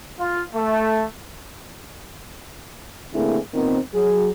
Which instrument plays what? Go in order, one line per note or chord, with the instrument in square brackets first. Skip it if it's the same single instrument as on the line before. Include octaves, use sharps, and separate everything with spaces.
[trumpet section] F4
A3
[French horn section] D3 A3 A#3 C4 E4 G#4
A#2 D#3 B3 C4
F#3 G#4